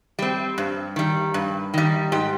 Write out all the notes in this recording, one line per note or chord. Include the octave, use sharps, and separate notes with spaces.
G3 C4
G2
D#3 G3
G2
D#3 G3
G#2 G4